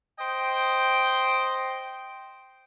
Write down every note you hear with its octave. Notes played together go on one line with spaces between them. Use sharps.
C5 D#5 G5